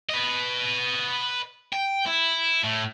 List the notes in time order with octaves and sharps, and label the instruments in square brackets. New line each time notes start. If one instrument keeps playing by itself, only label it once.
[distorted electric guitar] B4 D#5
G5
E4
A2